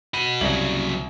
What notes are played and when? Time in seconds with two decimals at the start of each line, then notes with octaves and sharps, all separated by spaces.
0.14 F#4 B5 D#7
0.41 C2 C#3 F#3 F#7